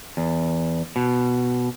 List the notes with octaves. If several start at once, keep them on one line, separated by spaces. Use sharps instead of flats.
E2
B2